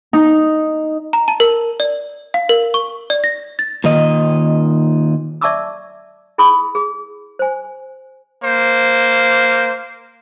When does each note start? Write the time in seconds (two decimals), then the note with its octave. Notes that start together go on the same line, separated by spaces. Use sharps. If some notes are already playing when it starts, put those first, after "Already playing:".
0.13 D#4
1.13 A#5
1.28 A5
1.40 A#4
1.80 D5
2.34 F5
2.49 A#4
2.74 C#6
3.10 D5
3.24 A#6
3.59 A6
3.84 A#2 D#3 D#5
5.41 D5 E5 A5 C#6 D6 E6
6.38 E4 G#4 B5 D#6
6.75 G#4
7.39 C5 G#5
8.44 A#3 C5